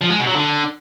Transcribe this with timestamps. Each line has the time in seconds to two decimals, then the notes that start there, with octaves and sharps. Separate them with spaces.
0.01 F3
0.10 G#3
0.19 B2
0.27 F#3
0.36 D3